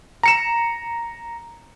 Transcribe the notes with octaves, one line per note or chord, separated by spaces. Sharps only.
A#5 C#7 E7